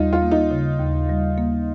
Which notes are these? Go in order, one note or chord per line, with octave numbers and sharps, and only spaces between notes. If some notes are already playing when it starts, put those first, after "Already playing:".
Already playing: D#2 G3 D#4 F4
F4
A#3
D#4
C#3
D#2
G3
A#3